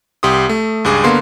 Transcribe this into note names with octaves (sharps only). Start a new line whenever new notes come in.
C2 G4 C6 D#6
A3
C#2 G2 G#4 D6
D3 A#3 B3 F5 C6